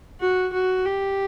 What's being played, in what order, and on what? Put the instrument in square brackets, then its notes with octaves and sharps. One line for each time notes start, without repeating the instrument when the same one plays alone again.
[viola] F#4
F#4
G4